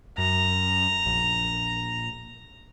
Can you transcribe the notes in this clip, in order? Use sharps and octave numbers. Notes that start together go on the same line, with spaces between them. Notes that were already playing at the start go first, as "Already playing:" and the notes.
F#2 A#5
A#1